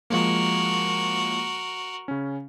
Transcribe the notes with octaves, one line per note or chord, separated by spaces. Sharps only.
F3 G#3 A#3 F#4 A#4
C#3 C#4